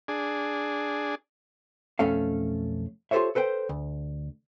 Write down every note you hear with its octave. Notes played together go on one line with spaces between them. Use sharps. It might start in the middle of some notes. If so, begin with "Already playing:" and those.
D4 G#4
B1 F2 A3 C#4 A4 F5
F4 G4 A4 C5 C#5 E5
A4 B4 C5 G5
D2